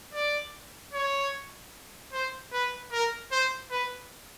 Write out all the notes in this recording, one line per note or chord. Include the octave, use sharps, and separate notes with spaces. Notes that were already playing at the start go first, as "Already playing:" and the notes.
D5
C#5
C5
B4
A#4
C5
B4